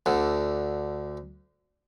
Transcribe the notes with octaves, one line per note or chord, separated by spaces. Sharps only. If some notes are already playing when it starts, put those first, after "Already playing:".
D2 D3